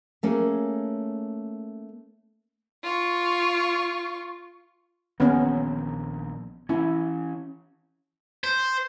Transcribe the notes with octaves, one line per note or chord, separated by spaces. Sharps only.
A3 A#3 C#4 G#4
F4 C#6
A#1 D#3 A#3 B3 C#4
E3 C#4 E4
C5